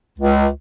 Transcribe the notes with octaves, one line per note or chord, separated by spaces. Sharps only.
C#2